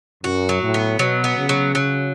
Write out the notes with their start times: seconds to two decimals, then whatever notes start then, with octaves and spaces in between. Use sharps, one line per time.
0.24 F#2 F#4
0.49 F#3
0.61 A2
0.74 B3
0.99 B2 F#3
1.24 B3
1.37 C#3
1.49 F#3
1.75 F#3